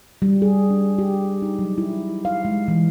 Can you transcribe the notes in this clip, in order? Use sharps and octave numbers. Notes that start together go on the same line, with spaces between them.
G3
G#4
D4
G4
D#4
F#3
E4
F5
G#3
E3